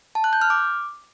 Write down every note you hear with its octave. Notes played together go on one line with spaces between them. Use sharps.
A5
F#6
G6
F6
D6